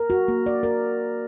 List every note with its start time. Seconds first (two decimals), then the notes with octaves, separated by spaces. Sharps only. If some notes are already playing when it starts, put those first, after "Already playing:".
Already playing: A#4
0.10 F#4
0.28 A#3
0.46 D5
0.63 A#4